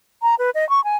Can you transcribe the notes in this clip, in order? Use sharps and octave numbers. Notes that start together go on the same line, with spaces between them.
A#5
B4
D#5
C#6
G#5